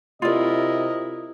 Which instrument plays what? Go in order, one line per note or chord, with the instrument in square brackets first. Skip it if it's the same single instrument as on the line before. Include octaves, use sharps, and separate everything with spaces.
[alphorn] C3 [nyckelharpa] E4 A#4 [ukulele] F4 D5 [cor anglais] D#5